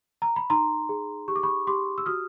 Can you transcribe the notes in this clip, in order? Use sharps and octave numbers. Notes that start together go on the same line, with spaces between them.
A#5
B5
D#4 A#5 C6
G#4
G4 C#6
D6
B5 C#6
G4 C6 D6
E6
F#4 D#6 F6